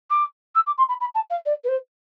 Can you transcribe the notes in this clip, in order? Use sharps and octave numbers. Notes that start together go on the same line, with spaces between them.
D6
E6
D6
C6
B5
B5
A5
F5
D5
B4
C5